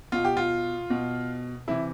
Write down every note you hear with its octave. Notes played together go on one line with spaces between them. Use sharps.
B2 F4
G4
F4
B2
C3 E3 E4